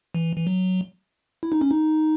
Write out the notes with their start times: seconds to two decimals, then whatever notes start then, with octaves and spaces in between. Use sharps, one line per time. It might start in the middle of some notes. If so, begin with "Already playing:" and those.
0.15 E3
0.36 E3
0.47 F#3
1.43 E4
1.52 D#4
1.61 C#4
1.71 D#4